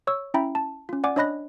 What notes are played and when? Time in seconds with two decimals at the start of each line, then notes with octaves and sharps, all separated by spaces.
0.07 C#5 C#6 E6
0.34 C#4 E4 E5 G5 A#5 B5
0.55 A5
0.89 C#4 F4
1.04 D5 F#5 G#5 D6
1.16 D4 C#5 D#5 B5 F#6 A#6